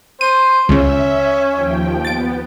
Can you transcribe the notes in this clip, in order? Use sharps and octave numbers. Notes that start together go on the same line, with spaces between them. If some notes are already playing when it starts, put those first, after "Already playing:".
C5 D#7
C#2 C#3 C#4 E5
D#2 F3 G5
B3 A6 D7